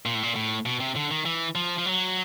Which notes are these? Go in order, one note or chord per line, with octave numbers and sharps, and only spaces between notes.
A#2
A2
A#2
A2
B2
C3
D3
D#3
E3
F3
F3
F#3